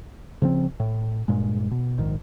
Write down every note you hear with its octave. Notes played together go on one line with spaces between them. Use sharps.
C#3 F3 A#3 C4
A2
G2 A#2 G#3
B2
A#1 G#2 D#3